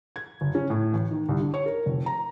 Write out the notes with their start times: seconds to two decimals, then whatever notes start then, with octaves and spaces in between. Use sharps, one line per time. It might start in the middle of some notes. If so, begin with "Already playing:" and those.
0.16 G#6
0.41 F#1
0.55 C#4
0.70 A2
0.93 A1
1.11 D#3
1.29 C2
1.41 D3
1.54 C#5
1.66 A#4
1.86 F1
2.06 A#5